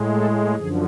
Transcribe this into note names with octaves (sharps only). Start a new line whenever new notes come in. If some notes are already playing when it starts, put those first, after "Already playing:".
Already playing: A2 G#3
A4
F#2 D3 F3 G#4